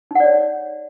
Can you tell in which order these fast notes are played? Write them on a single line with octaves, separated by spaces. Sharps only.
D#4 F#5 D5 C#5